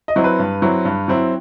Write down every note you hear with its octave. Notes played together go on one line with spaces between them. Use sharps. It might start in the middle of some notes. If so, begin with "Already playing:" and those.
D#5
F#3 C4 E4
B4
G2
F#3 C4 E4
G2
F#3 C4 E4